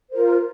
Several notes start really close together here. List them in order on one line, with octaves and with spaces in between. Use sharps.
C5 A#4 F4